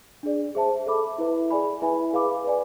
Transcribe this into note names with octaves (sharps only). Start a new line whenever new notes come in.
D4 G#4 D5
G#4 C5 E5 A5
A4 E5 B5 D6
E4 B4 E5
G#4 D5 G#5 B5
E4 B4 E5 G#5 B5
G#4 B4 F5 B5 D6
B4 D5 G#5